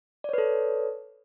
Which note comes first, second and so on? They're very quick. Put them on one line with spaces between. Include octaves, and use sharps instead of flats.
D5 C#5 B4 A4